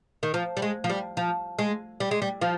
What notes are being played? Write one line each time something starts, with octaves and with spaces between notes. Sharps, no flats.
D#3
F3
G3
G#3
F3
G3
F3
G#3
G3
G#3
G3
F3